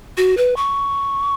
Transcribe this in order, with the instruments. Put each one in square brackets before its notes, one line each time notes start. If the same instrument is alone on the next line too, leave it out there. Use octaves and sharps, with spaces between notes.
[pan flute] F#4
B4
C#6